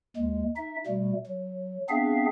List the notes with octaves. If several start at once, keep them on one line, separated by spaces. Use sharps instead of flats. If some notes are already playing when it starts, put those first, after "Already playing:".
D#2 G#3
D#4 E5
B2 G3 A3
F#3
B3 C4 D4 G#4 E5 F5